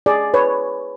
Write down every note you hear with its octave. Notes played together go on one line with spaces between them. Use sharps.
G#4 D5
B4 C#5